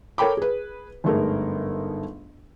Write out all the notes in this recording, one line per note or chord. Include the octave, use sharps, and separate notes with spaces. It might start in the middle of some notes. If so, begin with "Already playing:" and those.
A4 A#4 C#5 G5 B5 D6
G#4 B4
G1 G#2 A3 G#4 A#4